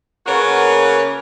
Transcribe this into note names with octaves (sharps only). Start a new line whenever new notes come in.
C#3 A#3 B3 F#4 A#4 B4